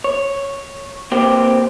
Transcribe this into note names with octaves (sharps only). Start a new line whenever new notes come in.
C#5
A#3 C4 G4